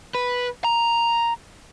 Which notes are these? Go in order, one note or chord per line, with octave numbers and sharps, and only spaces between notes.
B4
A#5